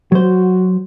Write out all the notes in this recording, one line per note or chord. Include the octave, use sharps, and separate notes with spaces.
F#3 F#4 C5